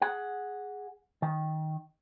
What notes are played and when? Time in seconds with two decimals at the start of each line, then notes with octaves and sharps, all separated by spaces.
0.02 G#4 F#5
1.22 D#3